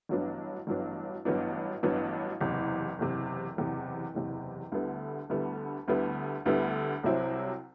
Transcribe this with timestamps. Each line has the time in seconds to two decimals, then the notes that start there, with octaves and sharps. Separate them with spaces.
0.09 A1 G2 F#3 B3 D4
0.67 A1 G2 F#3 B3 D4
1.25 A1 G2 F#3 B3 D4
1.83 A1 G2 F#3 B3 D4
2.41 F#1 E2 C3
2.99 F#1 E2 C3
3.57 F#1 E2 C3
4.15 F#1 E2 C3
4.72 D2 D3 G3 B3 E4
5.30 D2 D3 G3 B3 E4
5.88 D2 D3 G3 B3 E4
6.46 D2 D3 G3 B3 E4
7.03 C2 C3 F#3 C4 E4